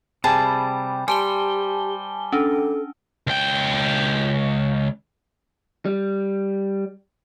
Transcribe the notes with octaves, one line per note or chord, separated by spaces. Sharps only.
C3 G3 G#4 G5 A5 B5
G3 G4 C5 G#5 A5 G7
C#4 D4 A4
C#2 G5
G3